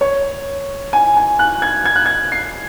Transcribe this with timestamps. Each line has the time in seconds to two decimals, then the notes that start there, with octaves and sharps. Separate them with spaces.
0.01 C#5
0.93 G#5
1.17 G#5
1.39 F#6
1.62 G#6
1.85 G#6
1.95 F#6
2.06 G#6
2.32 C7